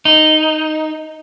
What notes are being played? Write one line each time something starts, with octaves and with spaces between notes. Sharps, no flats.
D#4